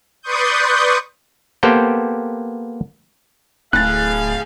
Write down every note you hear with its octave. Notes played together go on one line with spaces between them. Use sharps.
B4 D5 C6 C#6 D#6 G6
A#3 B3 G4 A4 C5 G5
D1 A2 G#4 F5 F#6 A6